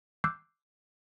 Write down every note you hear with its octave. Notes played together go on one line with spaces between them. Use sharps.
D6 E6 F#6 G6 C7